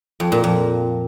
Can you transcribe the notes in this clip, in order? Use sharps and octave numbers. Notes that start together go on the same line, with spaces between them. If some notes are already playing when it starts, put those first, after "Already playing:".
F2
A#2
F2